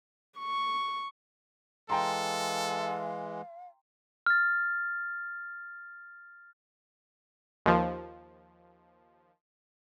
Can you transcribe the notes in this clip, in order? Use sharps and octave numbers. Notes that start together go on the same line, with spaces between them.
C#6
E3 G#3 A4 F5 G5 A#5 C6
F6 A6
D#2 F3